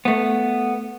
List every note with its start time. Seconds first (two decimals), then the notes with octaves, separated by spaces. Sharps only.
0.05 A3 B3